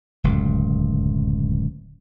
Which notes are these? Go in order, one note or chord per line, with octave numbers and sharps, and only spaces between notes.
D1 C#2 F#2